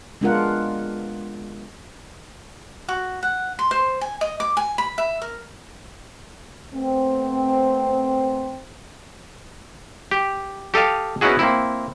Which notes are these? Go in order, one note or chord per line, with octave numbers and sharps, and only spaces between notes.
G#3 B3 D4 F4 A#4 F#5
F#4
F#5
C6
C5
G#5
D#5
D6
G#5
B5
E5
A#4
A3 B3 C4
G4
G4 A4 D#5 F5
B3 C#4 D#4 E4 F#4 G#4
A#3 C4 E4